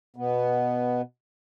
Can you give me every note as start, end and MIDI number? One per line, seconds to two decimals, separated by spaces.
0.16 1.02 47
0.16 1.02 59